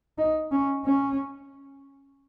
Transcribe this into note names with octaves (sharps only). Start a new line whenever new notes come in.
D#4
C#4
C#4